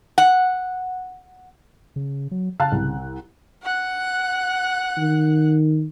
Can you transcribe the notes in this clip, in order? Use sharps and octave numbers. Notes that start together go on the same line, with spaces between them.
F#5
C#3
F#3
C#3 F5 A5 F#6
C2
F#5 F#6
D#3